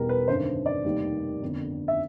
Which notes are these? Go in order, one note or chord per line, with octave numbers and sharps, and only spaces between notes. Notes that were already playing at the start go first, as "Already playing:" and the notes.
Already playing: E2 B2 G3 A#4
B4
G#1 F#2 D3 C5
D5
F1 D#2 D#3 G3
G1 F2 D3
E5